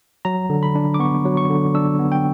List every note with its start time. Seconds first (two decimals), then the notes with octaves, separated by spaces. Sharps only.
0.25 F#3 A#5
0.50 D3
0.63 B5
0.75 D4
0.94 D6
0.99 B3 C#6
1.25 F#3
1.37 C#6
1.50 D3
1.74 D4 E6
1.99 B3
2.12 G5